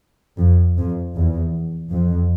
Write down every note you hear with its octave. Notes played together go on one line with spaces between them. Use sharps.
F2
F2
E2
F2